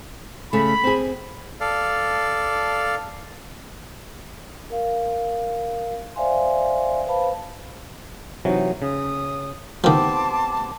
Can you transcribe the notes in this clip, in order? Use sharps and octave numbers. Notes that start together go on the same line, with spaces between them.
C#3 A3 B5
C4 G#4
A4 D5 F5
A#4 F5
C5 D5 E5 F5 G#5 C6
B4 C5 F5 A5 B5
C3 E3 F#3 D#4
C#3 D#6
D#3 F3 B3 C4 G4 A5 C6 D6